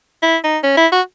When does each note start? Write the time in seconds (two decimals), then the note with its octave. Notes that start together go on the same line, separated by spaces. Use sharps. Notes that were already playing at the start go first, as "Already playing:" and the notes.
0.23 E4
0.44 D#4
0.63 C#4
0.77 E4
0.92 F#4